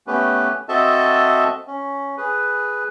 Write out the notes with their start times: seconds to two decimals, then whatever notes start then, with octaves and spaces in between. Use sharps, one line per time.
0.07 A3 B3 C#4 G4 B4
0.69 C4 F#4 A4 D#5 E5 A5
1.67 C#4
2.18 G#4 B4